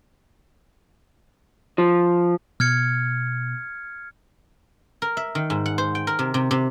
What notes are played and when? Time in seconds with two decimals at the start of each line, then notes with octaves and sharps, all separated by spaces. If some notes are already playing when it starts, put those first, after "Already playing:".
1.78 F3
2.60 B2 F6 G#6 C#7
5.02 A#4
5.17 E5
5.35 D#3
5.50 G#2
5.66 F#5
5.78 C5
5.95 G5
6.07 A#4
6.19 C3
6.34 C3
6.51 C3